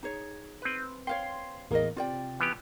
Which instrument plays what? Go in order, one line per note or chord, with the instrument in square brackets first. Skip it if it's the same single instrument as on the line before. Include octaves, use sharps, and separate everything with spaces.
[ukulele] D#4 G#4 C#5
[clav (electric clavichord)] C4 B4
[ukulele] C#5 F5 G5 [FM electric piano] C6
[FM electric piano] A1 E2 A#3 [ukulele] G#4 A#4 D#5
[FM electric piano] C3 [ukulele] F4 D5 G5
[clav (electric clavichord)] E3 B3 G4